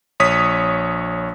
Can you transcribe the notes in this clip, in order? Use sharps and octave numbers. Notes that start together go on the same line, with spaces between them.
A#1 C#5 D#6 B6